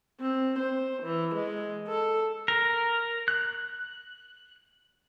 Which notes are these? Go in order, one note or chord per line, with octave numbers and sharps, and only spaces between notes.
C4
C5
E3
G#3
A4
A#4
F#6